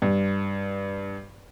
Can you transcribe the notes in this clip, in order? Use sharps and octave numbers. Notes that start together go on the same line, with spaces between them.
G2